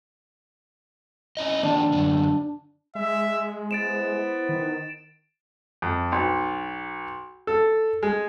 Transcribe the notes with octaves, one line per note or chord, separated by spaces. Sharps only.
C#4 E4 D#5
D#3 F3 A#3 D4
F#2 D3
G#3 E5
B3 E4 C5 A6 D7 E7
D#3
F2
B1
A4
G#3